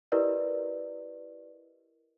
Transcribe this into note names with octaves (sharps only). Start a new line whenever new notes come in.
E4 G4 A#4 B4 D5 D#5